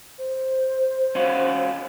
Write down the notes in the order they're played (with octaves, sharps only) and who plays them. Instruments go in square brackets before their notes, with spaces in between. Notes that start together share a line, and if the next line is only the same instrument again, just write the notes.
[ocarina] C5
[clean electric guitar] C#4 F4 F#4